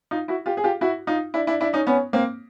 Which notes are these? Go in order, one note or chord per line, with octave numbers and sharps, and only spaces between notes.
D#4 F4
E4 F#4
F4 G4
G#4
F4 G4
E4 F#4
D#4 F4
D4 E4
D4 E4
D4 E4
C#4 D#4
B3 C#4
A#3 C4